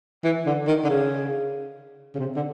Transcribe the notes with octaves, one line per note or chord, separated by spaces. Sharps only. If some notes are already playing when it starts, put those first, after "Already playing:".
E3
D3
D#3
D3
C#3
C#3
C3
D3